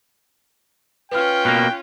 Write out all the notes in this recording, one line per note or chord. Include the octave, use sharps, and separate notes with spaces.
C#4 F4 B4 G5 F6
B2 A#3 F#6